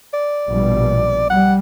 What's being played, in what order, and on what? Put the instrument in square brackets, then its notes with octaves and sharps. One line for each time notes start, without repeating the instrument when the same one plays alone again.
[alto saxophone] D5
[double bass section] A#1 B2 G3
[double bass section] G3 [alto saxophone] F#5